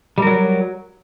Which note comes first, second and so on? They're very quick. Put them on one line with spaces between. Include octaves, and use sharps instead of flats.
G3 A#4 F#3